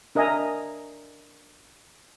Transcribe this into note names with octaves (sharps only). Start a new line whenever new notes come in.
D4 A#4 D#5 E5 G#5 A#5